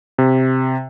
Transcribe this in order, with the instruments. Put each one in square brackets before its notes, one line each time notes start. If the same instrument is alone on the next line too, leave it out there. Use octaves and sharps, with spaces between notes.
[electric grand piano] C3